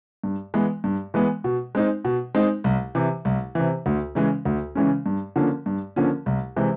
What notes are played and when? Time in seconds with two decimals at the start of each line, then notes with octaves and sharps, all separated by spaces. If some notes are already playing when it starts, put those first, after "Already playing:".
0.24 G2
0.54 E3 G#3 B3
0.84 G2
1.14 E3 G#3 B3
1.44 B2
1.75 G#3 C4 D#4
2.05 B2
2.35 G#3 C4 D#4
2.64 C2
2.95 C3 E3
3.25 C2
3.55 C3 E3
3.86 D2
4.15 C#3 E3 G#3 C#4
4.45 D2
4.75 C#3 E3 G#3 C#4
5.06 G2
5.36 D3 F3 A#3 C#4
5.66 G2
5.96 D3 F3 A#3 C#4
6.26 C2
6.56 C3 E3 G#3